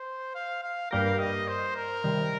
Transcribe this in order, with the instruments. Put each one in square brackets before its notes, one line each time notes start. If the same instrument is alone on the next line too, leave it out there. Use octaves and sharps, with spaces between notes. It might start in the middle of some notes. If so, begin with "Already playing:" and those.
Already playing: [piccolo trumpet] C5
F5
F5
[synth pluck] G2 G3 A#3 G4 A#4 [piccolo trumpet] F5
[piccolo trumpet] D#5
C5
A#4
[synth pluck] C3 D#3 G3